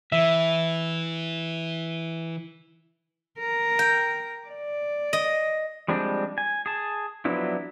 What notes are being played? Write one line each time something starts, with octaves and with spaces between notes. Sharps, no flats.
E3 E5
A#4
G5
D5
D#5
F3 G3 G#3 C4 D4
G#5
G#4 A5
F3 F#3 B3 D4 E4